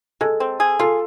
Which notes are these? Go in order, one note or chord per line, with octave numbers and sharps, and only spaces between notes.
G#3 A4
C4
G#4
F4 A4